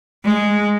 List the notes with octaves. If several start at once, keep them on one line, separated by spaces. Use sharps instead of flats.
G#3